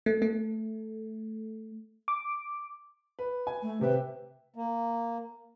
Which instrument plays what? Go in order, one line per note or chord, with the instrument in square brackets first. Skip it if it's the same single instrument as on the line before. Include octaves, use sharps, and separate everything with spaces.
[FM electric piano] A3
A3
D6
[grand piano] B4
[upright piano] G#5
[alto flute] A3
[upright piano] C3 [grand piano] G4 E5 G5 [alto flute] B4
[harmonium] A#3